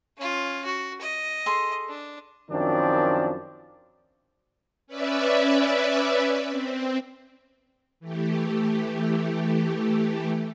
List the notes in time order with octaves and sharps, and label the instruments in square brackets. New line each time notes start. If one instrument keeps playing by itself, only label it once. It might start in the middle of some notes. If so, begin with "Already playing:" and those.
[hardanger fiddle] C#4 F4
F#4
D#5
[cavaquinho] G#4 A4 C6
[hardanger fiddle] D4
[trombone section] F#2 D#3 F3 C4 D4
[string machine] C#4 B4 D5 E5
C4
E3 A3 G4